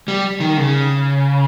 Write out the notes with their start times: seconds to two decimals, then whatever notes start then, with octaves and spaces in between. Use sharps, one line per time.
0.08 G3
0.40 D#3
0.57 C#3